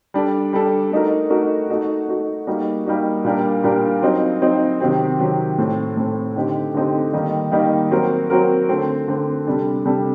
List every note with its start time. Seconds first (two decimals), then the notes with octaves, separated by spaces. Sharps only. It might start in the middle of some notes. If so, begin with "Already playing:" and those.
0.14 G3 D4 A4
0.53 G3 D4 A4
0.92 A3 D#4 F#4 A#4
1.30 A3 D#4 F#4 A#4
1.70 A3 D#4 F#4
2.08 A3 D#4 F#4
2.47 G3 A#3 D#4 F#4
2.86 G3 A#3 D#4 F#4
3.24 A#2 G3 D4 G4 A#4
3.63 A#2 G3 D4 G4 A#4
4.02 F#3 C4 D#4
4.41 F#3 C4 D#4
4.80 C3 D#3 F#3 C4 G4
5.19 C3 D#3 F#3 C4 G4
5.58 A2 A3 C4
5.97 A2 A3 C4
6.36 D3 A3 C4 D#4 G4
6.74 D3 A3 C4 D#4 G4
7.13 D#3 G3 A#3 D#4
7.52 D#3 G3 A#3 D#4
7.91 F#3 C4 F#4 A#4
8.30 F#3 C4 F#4 A#4
8.69 D3 A3 C4
9.08 D3 A3 C4
9.47 C3 G3 D4 A4
9.85 C3 G3 D4 A4